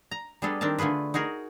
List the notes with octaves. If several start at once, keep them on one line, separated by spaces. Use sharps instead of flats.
A#5
G3 B3 D4 G#4 A4 B4
D#3 C4 D4 A#4 A5
D3 A3 F4 G#4 B4
D#4 F#4 G#4 A#4